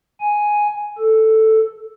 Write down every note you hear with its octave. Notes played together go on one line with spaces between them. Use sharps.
G#5
A4